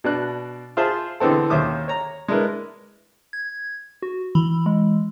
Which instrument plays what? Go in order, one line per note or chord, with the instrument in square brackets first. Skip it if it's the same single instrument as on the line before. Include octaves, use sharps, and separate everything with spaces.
[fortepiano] B2 D4 F#6
F4 G#4 C5 E5 A5
D3 E3 B3 C4 A4
D#2 C#4 C5 E5 D6 D#6
C#5 A#5
G#3 D4 E4 A#4 B4
[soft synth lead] G#6
F#4
[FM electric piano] E3 [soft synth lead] B5
[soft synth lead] G#3